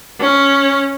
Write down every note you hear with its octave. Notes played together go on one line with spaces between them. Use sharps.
C#4